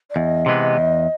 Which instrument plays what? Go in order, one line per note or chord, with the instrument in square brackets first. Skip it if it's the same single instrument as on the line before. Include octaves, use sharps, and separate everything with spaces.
[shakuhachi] D5
[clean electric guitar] E2 [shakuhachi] D#5
[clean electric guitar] C3 E3 G#3 B3
E2